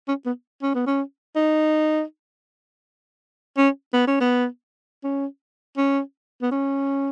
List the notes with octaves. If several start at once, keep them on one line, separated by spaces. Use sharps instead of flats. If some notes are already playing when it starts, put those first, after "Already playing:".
C#4
B3
C#4
B3
C#4
D#4
C#4
B3
C#4
B3
C#4
C#4
B3
C#4